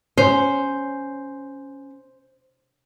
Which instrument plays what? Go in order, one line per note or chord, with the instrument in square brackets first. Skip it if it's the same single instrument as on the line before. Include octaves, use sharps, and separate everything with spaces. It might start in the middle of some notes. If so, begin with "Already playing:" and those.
[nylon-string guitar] C#4 [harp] C5